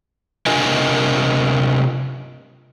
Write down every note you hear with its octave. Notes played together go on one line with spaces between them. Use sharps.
C3 D4 F4 A#4 D#5 G#5